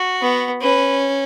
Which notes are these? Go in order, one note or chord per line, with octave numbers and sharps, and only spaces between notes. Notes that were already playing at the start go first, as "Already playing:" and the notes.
Already playing: F#4
B3
C#4 B4